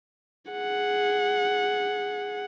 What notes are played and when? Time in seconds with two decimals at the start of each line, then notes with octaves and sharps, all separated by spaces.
0.51 G#4 F#5